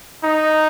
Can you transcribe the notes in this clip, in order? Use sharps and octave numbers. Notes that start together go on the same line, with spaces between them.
D#4